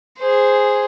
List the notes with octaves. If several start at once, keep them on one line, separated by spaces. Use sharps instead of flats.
G#4 C5